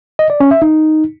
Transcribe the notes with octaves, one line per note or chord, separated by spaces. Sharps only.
D#5
D5
C#4
E5
D#4